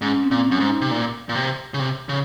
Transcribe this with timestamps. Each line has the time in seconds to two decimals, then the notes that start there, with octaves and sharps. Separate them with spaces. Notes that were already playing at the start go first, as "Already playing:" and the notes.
0.01 G#2 C#4
0.23 C4
0.31 A#2
0.46 C#4
0.51 F#2
0.60 G#2
0.68 D#4
0.81 C3
0.91 A#2
1.29 A#2
1.35 C3
1.74 C#3
1.80 C3
2.09 C#3